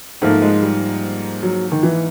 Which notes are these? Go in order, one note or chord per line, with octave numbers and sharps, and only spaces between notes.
G#2 F3 A3 A#3
G#3
G3
F#3
D#3
E3